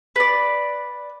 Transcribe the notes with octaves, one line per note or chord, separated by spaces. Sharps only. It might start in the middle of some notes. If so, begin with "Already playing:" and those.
B4 D5